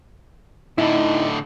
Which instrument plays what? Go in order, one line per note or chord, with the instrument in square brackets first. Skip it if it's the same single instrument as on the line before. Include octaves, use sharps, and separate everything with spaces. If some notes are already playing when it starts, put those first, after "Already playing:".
[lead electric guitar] A2 D3 [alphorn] D#4 [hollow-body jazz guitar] E4